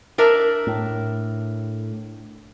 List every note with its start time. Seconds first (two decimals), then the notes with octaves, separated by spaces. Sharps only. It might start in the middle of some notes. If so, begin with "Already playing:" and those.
0.18 D4 A#4 E5
0.67 A2